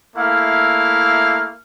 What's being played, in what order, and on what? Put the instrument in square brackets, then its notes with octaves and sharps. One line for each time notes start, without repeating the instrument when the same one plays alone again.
[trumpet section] A3 A#3 E4 F5